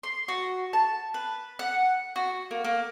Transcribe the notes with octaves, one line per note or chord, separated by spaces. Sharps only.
C6
F#4
A5
B4
F#5
F#4
A#3
A#3